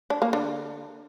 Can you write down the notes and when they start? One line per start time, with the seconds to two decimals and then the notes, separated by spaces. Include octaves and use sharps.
0.10 D4
0.22 A#3
0.33 D3